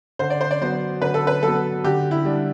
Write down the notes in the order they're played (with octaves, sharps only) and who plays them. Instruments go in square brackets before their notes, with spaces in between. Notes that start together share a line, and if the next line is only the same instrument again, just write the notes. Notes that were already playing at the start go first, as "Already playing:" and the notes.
[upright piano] D3 [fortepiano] C5
[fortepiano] D5
C5
D5
[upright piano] F#3 B3 [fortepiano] C5
[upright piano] D3 [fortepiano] B4
[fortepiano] A4
B4
[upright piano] F#3 [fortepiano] A4
[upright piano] B3
[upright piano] D3 [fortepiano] G4
[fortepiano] E4
[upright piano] G3 D4